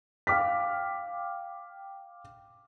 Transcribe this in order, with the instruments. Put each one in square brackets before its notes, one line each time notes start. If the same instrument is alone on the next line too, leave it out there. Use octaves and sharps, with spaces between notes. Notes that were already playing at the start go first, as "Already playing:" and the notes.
[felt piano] F5 G5 D6 F6 B6